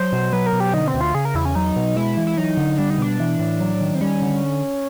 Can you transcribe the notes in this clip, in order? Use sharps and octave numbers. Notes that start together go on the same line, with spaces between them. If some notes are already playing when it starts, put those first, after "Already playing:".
Already playing: F#3 C5
B2
F#3 B4
A#4
B2
G4
D3 D#4
C4
D2
F4
C#3 G#4
A#4
E2 E4
C#4
F#3 D#4
B2
G#3 E4
E3
E4
F#3 D#4
D3
G3 D4
D#4
B2 D4
E3
A2
F#3
D#3
C4
G3 C#4
D3